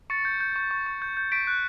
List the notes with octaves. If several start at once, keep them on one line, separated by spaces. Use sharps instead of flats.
C#6 A6 C#7
G6
G6
C#6
C#6
C#6
G6
G6
C#6 B6 D7
F#6